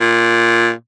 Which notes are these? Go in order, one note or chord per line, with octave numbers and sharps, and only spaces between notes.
A#2